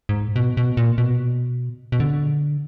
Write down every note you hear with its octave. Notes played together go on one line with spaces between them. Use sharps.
G#2
B2
B2
A#2
B2
B2
D3